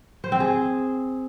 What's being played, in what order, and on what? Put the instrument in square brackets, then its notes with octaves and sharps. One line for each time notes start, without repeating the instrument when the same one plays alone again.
[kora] C5
C4
G#4